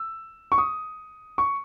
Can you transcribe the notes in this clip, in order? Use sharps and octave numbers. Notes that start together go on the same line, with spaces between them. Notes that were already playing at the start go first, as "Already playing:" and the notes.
Already playing: E6
C#6
D#6
C#6